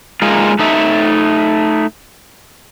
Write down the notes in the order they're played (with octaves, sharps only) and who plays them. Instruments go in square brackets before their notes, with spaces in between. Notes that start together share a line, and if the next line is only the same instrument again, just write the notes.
[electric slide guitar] G#3 A#3 D#4 F4
A3 D#4 E5